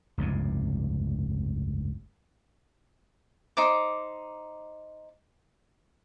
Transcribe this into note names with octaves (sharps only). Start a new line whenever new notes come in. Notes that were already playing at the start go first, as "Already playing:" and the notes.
F1 C#2 G2 C3
D#4 C5 D6